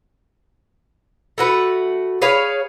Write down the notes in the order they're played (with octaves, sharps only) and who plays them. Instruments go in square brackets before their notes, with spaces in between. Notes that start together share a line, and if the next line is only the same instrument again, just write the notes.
[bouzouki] A3 F#4 B4
G#4 B4 C#5 F5